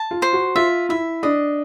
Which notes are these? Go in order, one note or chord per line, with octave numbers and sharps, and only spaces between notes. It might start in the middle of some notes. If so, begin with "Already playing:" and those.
Already playing: A5
F4
C5
F#4
F4 E5
E4 E5
D4 D#5